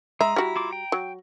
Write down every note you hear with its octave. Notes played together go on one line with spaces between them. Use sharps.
G#3 E5 A#5
G3 E4 F#4
E4 F4 D6
G5
F#3